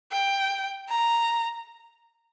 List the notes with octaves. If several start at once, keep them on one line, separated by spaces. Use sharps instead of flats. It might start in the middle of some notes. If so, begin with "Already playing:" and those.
G5
A#5